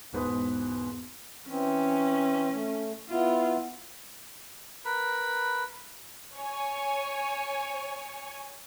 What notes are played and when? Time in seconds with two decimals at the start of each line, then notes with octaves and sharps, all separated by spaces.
0.13 E1 G#2 B2 B4 D#6
1.49 E3 C4 C#4
2.51 A3
3.10 B3 E4 F4
4.85 A#4 B4 B5
6.35 C#5 G#5